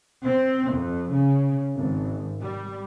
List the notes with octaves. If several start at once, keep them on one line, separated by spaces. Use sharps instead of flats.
C4
F2
C#3
G#1
G3